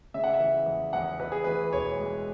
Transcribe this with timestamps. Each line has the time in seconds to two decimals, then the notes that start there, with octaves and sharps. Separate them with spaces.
0.14 C#3 E5
0.24 F#5
0.34 E5
0.40 E3
0.66 E2
0.93 E2 F#5
1.19 E2 B4
1.32 G#4
1.44 E3 B4
1.73 E1 C#5
1.99 G#3